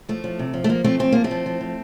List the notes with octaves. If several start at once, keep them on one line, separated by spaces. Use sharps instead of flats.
F3 A3
F3
C3
F3
A3
F3 A#3
F3 A3 C4
F3 C4
F3 A#3
A3 C4
F3
F3
F3